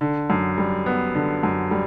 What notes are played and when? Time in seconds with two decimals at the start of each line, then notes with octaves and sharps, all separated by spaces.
0.01 D3
0.30 F#2
0.58 G3
0.86 B3
1.15 D3
1.43 F#2
1.71 G3